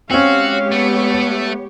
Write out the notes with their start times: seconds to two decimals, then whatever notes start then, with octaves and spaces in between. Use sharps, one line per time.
0.10 G#3 C4 C#4 F#4 G4 C#5 F5
0.72 A3 B3